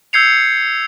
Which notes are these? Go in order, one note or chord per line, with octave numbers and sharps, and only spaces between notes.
E6 G6 G#6 C7 C#7 F7